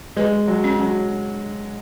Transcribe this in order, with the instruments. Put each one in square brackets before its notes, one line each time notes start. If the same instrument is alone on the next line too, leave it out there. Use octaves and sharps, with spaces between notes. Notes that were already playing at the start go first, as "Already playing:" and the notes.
[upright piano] G#3 [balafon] B4
[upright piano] F#3
[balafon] C#4
[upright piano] F#3